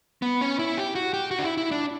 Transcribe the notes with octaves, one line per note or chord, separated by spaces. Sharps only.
B3
C#4
E4
G4
F#4
G4
F#4
D4
E4
E4
D4